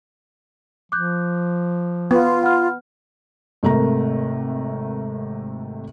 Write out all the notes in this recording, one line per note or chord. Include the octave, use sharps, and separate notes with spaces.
F3 D6 F#6 G6
B3 F4
F#5 B5 F6
G#1 C3 A3 A#4 A#5